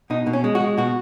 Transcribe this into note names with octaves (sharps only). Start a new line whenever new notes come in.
B2 D#4
B2
C#4
G#3
F#4
G#3
B2 F#4